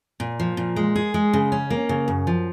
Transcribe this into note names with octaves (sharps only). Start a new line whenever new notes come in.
A#2
F3
A#2
G#3
G#4
G#3
C#3
C#4
A#3
C#3
F#2
F3